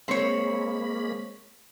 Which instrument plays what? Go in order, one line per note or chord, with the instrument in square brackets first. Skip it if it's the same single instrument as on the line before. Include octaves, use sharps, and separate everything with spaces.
[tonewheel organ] G#3 A#3 B5 [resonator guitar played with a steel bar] C4 C#5